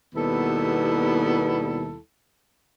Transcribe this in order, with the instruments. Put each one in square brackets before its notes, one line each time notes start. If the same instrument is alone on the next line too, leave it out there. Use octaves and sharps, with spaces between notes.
[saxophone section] D#2 B2 G3 B3 E4 A4